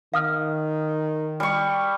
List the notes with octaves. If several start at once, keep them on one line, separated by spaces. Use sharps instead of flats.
D#3 F5 D#6 F6
G3 C#6